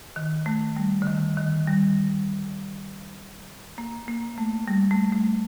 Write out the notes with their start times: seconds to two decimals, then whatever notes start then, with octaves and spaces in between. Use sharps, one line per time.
0.16 D#3
0.46 A3
0.77 G3
1.02 D3
1.07 D#3
1.37 D#3
1.67 G3
3.78 A#3
4.08 A#3
4.38 A3
4.68 G3
4.91 A3
5.12 A3